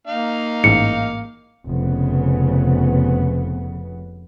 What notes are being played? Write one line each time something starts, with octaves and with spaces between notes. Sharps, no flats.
A#3 D#4 F5
A1 G#2 C#7
F1 C#3 B3